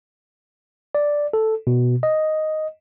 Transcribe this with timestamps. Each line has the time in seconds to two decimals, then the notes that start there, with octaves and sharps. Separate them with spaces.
0.95 D5
1.33 A4
1.67 B2
2.03 D#5